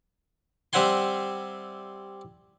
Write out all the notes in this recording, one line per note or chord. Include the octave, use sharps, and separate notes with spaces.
G3 C4 E5 F#5 G#5 C6